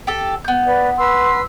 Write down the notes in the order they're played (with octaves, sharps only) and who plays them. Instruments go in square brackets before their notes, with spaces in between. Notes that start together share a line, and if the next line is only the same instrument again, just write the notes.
[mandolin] G4 A4
B3 G6
[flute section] B4 D5
B4 C6 E6